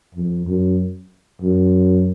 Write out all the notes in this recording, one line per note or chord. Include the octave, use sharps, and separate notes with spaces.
F2
F#2
F#2